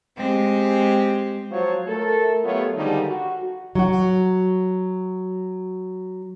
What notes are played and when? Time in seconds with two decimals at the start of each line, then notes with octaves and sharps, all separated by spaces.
0.16 G#3 C4 G4
1.52 F3 F#3 F4 F#4 C5 C#5
1.87 A3 A4 A#4
2.44 F#3 A3 B3 F4 G4 C#5
2.75 D3 D#3 F3 G3 G#3 D#4
3.08 F#4
3.75 F#3 F#4